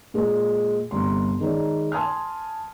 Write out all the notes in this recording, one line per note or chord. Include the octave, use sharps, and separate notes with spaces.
A#2 G#3
G1 C2 C6
D#3 G#3 D#4 C#5 D5
G#5 A5 C6 D#6 F6